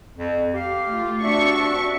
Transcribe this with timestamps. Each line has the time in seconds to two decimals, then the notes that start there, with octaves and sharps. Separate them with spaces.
0.17 F2
0.54 G4 F5
0.91 A3 F4
1.22 C4 D4 F#4 E5 C#6